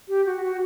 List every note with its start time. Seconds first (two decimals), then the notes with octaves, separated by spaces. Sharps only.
0.09 G4
0.26 F#4
0.42 F#4